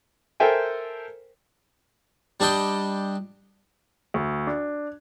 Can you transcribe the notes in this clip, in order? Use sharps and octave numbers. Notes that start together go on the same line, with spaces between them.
A4 A#4 C5 E5 G5 G#5
G3 D4 D#5 G5
D2
D4